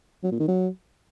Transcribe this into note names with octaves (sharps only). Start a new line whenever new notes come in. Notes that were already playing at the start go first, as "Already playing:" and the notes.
F#3
A#2
D#3
F#3